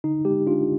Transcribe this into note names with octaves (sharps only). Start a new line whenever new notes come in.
D3 D#4
G#3 G4
D4 F4